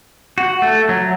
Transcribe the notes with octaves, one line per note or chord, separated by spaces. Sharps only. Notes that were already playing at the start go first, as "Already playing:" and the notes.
F#4
A3
F#3